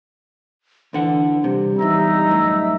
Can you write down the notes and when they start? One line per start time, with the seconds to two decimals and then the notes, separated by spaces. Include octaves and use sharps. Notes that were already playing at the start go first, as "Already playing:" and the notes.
0.93 D2 D3 E3 F#5
1.44 C3 G3
1.79 B1 E2 D#4 E5 A#5 E6
2.27 F#2 A2